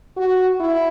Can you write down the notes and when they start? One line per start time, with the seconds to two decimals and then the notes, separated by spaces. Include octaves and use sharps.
0.17 F#4
0.60 E4